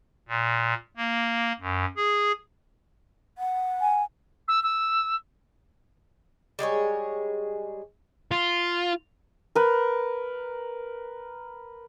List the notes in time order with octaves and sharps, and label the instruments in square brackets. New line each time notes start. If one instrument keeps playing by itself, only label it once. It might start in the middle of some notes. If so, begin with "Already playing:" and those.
[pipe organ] A#2
A#3
F#2
G#4
[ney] F#5
[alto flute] G#5
[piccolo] E6
E6
[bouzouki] G3 G#3 G#4 C#5
[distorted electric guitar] F4
[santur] A#4 B4